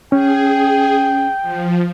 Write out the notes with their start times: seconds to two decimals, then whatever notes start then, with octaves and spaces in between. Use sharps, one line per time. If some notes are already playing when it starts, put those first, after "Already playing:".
0.12 C#4 G#4 G5
1.42 F3